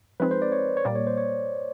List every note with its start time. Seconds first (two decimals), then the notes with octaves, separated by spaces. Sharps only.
0.20 F3 G#3 C4 D#4 G#4 B4
0.31 C5
0.42 D5
0.52 C#5
0.77 C#5
0.85 A#2 G3 A#3 D5
0.95 C#5
1.07 C5
1.17 C#5